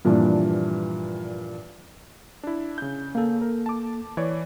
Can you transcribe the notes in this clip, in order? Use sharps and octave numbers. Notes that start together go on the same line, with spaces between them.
G2 A#2 E3 F3 D4
D4 E4
C#3 G6
A#3 A4
A#4
A5 D6
E3 C#5 D5